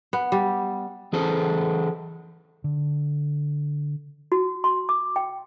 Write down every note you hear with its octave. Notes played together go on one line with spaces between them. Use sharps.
B3
G3
E3 G#4 A4 C5
D3
F#4
C6
D6
G5